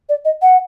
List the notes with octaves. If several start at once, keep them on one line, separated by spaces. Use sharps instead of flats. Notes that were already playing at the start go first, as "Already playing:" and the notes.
D5
D#5
F#5